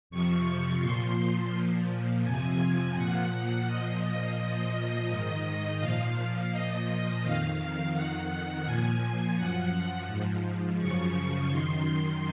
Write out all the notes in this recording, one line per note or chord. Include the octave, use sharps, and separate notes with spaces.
F2 C3 F3 C#6
A#2 F3 C6
A#2 F3
F2 C3 F3 G#5
A#2 F3 F#5
A#2 F3 D#5
A#2 F3 D#5
G#2 D#3 D#5
A#2 F3 F5
A#2 F3 D#5
F2 D#3 F5
F2 D#3 F#5
A#2 F3 G#5
F#2 F3 F#5
G#2 F3
F#2 C#3 F3 C#6
F#2 D#3 C6